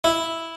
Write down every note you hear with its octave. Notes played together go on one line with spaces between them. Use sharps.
E4